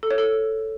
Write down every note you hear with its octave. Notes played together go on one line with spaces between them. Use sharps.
A4
C#5
A4